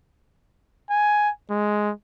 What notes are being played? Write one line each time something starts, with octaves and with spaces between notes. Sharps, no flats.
G#5
G#3